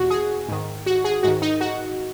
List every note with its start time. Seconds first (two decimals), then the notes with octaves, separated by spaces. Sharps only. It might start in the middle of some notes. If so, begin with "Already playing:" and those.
Already playing: E2 B2 F#4
0.10 G#4
0.49 G#2 D#3
0.86 F#4
1.04 G#4
1.23 G#2 D#3 F#4
1.42 D#4
1.61 F#4